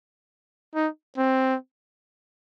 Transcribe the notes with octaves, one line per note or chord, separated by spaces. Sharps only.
D#4
C4